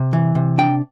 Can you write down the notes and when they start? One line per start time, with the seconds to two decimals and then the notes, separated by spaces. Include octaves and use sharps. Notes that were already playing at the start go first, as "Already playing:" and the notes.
Already playing: C3
0.13 E3
0.35 C3
0.58 D4 G5